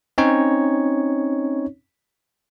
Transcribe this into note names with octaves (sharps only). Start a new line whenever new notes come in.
C4 C#4 D#4 C#5